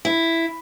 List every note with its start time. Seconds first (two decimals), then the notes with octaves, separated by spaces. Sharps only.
0.05 E4